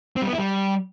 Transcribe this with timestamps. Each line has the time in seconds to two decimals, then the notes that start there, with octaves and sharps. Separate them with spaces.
0.16 C4
0.22 G3
0.27 B3
0.33 E4
0.38 G3